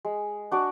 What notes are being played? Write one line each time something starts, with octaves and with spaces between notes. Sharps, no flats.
G#3
D4 F#4 D5